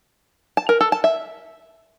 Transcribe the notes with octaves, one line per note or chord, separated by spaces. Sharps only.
A5
A#4
A4
A5
E5